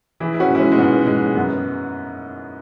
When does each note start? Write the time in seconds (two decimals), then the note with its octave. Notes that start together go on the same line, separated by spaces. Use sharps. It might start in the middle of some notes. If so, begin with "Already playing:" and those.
0.20 E3 E4 G#4
0.34 E4
0.40 C#4 F#4
0.50 G#2 E4
0.59 G#3 C#4
0.72 G#3
0.78 G#2 B3
1.07 G#2 G#3
1.35 F#2 B3